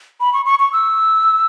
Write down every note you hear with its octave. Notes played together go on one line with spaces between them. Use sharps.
B5
C#6
C#6
C#6
E6